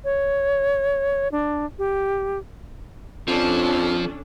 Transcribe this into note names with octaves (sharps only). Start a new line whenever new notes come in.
C#5
D4
G4
F2 F3 C#4 D4 A4